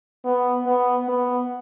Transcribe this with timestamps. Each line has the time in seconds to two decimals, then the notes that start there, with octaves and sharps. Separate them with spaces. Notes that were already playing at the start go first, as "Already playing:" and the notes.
0.25 B3
0.66 B3
1.08 B3